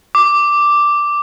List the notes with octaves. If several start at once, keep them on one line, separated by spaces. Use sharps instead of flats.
D6